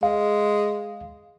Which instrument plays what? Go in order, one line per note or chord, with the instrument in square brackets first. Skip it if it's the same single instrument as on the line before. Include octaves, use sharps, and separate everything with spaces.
[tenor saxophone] G#3 [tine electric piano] F5